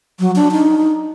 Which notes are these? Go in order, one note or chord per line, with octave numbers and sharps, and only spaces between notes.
F#3
D4
D#4